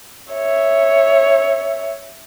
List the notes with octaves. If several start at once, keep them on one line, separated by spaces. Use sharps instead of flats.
C#5 E5